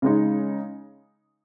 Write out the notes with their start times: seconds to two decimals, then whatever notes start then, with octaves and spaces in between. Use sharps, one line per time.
0.02 C#3 G#3 D#4